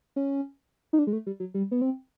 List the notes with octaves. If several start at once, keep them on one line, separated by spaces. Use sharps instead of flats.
C#4
D#4
D4
G#3
A3
G3
F#3
G3
B3
C4